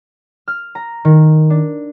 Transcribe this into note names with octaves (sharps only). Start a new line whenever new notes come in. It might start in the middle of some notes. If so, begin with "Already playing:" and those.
F6
A#5
D#3
D4